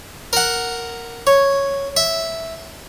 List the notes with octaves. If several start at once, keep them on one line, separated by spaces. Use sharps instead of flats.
A#4 F#5
C#5
E5